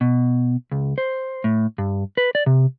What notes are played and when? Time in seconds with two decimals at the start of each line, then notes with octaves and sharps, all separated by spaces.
0.01 B2
0.72 C#2
0.98 C5
1.44 A2
1.78 G2
2.17 B4
2.35 D5
2.46 C3